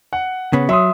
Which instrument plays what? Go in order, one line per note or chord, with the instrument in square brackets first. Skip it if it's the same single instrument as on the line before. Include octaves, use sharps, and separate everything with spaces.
[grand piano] F#5
[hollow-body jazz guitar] C#3 B3
[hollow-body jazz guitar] F#3 [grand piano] E5 C6 D#6